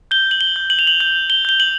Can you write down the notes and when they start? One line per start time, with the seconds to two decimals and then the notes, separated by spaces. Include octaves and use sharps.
0.11 G6 G7
0.31 F#7
0.41 G7
0.56 G6
0.70 F#7
0.79 F7
0.87 F#7
1.00 G6 F#7
1.30 G7
1.45 G6 G7
1.60 F#7